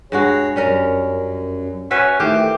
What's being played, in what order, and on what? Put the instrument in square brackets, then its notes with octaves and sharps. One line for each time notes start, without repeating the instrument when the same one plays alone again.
[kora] G2 G#3 F#4 [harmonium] G#4 C#5
[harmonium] F#2 [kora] G3 C#4 A#4
[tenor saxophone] C#4 [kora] F#4 B4 E5
[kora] D#3 E3 C5 [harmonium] A3 [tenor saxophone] G4